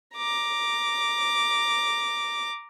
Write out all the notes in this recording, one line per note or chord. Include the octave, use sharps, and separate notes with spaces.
A#5 D6